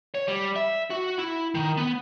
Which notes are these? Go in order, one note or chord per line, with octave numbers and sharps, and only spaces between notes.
C#5
G3
E5
F#4
E4
D#3
B3